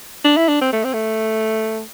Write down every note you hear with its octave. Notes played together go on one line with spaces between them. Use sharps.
D4
E4
D4
C4
A3
C4
A3